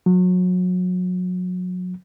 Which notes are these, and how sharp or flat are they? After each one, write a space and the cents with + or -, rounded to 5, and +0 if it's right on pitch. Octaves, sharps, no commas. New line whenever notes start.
F#3 -30